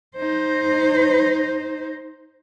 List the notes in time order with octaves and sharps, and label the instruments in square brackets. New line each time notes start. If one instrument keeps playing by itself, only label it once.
[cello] D#4 C5